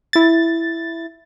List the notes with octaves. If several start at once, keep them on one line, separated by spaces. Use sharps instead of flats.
E4 A6